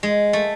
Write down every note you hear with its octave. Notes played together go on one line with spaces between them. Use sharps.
G#3
A3